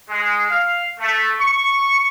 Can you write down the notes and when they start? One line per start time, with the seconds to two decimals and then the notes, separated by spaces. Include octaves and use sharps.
0.10 G#3
0.50 F5
1.00 A3
1.40 C#6